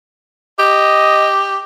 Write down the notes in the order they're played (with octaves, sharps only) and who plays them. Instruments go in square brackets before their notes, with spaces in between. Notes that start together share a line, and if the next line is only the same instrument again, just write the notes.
[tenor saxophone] G4 [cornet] D#5